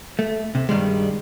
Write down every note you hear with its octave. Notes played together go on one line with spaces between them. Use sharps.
A3
C3
G2 D#3 G3 G#3